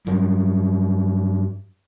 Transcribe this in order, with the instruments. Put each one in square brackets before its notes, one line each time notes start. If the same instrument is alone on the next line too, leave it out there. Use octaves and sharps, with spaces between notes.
[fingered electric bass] G2 F#3